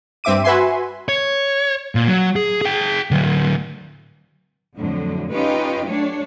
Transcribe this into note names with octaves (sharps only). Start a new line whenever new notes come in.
G2 C4 E5 D6 D#7
F#4 B4 E5 G#5 C6
C#5
A#2
F#3
G#4
G#4 G5
D3 F#3
F2 A2 D3 F#3
C#4 D#4 F4 G4 B4
F#3 A3 D4 C#5